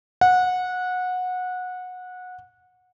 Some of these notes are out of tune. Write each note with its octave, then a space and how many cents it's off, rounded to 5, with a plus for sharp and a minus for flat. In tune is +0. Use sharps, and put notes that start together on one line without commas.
F#5 -20